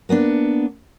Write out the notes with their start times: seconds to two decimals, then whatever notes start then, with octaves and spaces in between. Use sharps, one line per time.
0.09 A#3 B3 C#4 D4